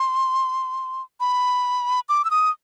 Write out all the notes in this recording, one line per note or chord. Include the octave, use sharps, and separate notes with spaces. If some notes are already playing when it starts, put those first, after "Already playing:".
Already playing: C6
B5
D6
E6
D#6